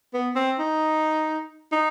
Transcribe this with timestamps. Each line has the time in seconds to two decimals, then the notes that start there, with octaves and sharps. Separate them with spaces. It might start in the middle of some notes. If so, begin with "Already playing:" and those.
0.14 B3
0.36 C4
0.59 D#4
1.72 D#4